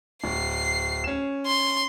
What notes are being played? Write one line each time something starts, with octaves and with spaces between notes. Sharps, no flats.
D1 C7
C#4 E7
C6